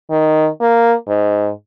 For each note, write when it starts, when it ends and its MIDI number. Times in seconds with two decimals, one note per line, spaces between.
0.10 0.48 51
0.61 0.94 58
1.08 1.50 44